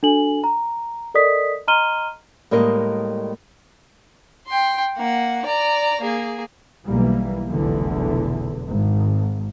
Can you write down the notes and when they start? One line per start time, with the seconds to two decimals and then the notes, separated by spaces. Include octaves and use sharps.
0.03 D4 F#4 A4 G#5 F#7
0.44 A#5
1.14 A4 A#4 D5 D#5 D#6 B6
1.67 D#5 A#5 C6 F6 D#7 G7
2.51 A2 G3 G#3 A#3 A#4 D#5
4.48 G5 C6
4.98 A#3 F#5
5.46 D5 A#5
6.01 A#3 G#4
6.88 B1 E3 G3 A#3
7.51 F1 B1 E2 D3 E3
8.69 G#1